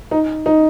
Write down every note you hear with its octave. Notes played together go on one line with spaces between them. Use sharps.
D#4
D#4